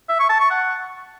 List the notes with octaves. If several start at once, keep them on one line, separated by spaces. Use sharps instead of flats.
E5
C#6
A5
C#6
F#5